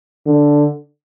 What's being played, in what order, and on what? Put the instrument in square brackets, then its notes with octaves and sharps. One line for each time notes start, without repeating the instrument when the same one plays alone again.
[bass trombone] D3